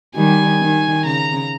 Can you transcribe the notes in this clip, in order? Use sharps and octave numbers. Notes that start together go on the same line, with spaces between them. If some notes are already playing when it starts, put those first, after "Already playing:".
D#3 G3 G#5
D#3
C#3 A#5